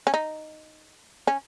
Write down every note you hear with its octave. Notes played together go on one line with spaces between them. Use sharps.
C#4
D#4
C#4